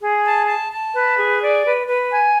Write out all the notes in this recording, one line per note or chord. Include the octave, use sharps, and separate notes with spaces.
G#4
A5
A5
A5
B4
G#4
D5
B4
B4
G#5